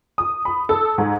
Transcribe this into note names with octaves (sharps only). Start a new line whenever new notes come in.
D#6
B5
A4
G#2